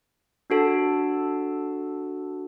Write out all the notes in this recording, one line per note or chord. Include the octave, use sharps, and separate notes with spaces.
D4 F#4 A4 A5